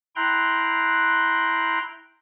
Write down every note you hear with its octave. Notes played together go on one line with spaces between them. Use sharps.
E4 G5 A#5 C6 F#6